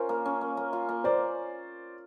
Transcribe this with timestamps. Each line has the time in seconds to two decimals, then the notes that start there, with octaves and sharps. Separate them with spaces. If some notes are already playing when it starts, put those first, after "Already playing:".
Already playing: C#4 F4 A#4 C5
0.09 A#3
0.25 C#4
0.41 A#3
0.57 A#3
0.73 F4
0.89 A#3
1.04 A#3 C5 D5